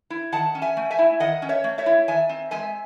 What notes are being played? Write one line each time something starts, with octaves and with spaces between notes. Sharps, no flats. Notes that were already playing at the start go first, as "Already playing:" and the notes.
E4
D#3 F#5 A5
C#4
E5 G#5
A3
E5 G#5
E4
D#3 D#5 F#5
C#4
C#5 E5
A3
C#5 E5
E4
D#3 E5 G#5
C4
G#3 E5 G#5